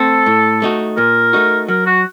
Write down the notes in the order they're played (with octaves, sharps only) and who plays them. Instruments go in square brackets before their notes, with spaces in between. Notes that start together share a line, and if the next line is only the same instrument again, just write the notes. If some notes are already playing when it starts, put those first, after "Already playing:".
Already playing: [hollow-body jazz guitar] A3 C4 [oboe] A4
[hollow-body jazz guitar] A2
A3 D#4 F#4
[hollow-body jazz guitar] A#2 [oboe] A#4
[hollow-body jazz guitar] A3 D#4 F#4
[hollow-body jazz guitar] F#3 [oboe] A#4
[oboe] F#4